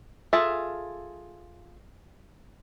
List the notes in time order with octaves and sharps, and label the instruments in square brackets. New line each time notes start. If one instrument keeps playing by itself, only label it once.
[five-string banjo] F4 G#4 A4 E5